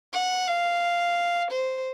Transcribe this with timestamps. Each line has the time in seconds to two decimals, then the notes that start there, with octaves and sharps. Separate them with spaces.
0.14 F#5
0.48 F5
1.52 C5